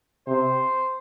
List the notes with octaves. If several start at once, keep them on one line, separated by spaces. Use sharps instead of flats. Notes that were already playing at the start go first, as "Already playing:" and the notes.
C3 C5